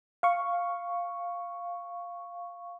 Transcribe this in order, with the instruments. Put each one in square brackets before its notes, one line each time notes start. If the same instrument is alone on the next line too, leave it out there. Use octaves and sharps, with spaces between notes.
[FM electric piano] F5 C#6